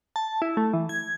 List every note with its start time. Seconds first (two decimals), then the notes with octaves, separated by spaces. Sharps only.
0.16 A5
0.42 E4
0.57 A3
0.73 E3
0.89 G#6